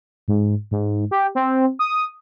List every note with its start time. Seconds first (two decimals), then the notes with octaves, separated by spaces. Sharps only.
0.28 G#2
0.71 G#2
1.11 G4
1.35 C4
1.79 D#6